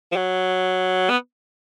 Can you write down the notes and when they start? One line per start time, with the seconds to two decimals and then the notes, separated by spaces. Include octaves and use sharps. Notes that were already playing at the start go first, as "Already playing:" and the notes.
0.12 F3
0.16 F#3
1.10 B3